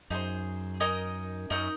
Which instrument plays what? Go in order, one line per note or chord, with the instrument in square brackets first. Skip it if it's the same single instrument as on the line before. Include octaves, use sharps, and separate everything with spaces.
[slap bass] F#2 [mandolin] D#4 G#4 C5
[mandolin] D#4 A#4 D#5 G#5
[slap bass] F#2 [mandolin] D#4 A#4 D#5